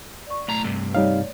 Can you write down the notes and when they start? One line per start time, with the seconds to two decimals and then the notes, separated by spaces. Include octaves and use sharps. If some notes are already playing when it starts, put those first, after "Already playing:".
0.27 D5 C#6
0.48 B1 A2 A3 A#5
0.64 G2 C3
0.95 G3 D#4 C#5 D5 F5